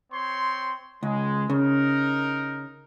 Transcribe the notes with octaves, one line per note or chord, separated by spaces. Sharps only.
C4 C#5 C6
C#2 G#3
C#3 D#4 A#4